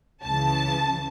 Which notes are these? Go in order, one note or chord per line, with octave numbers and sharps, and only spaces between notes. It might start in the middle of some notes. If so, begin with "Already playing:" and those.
C#2 C#3 E3 A5